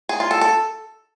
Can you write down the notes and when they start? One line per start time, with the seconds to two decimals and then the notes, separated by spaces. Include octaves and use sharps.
0.09 G#4
0.20 F4
0.31 A4
0.41 A4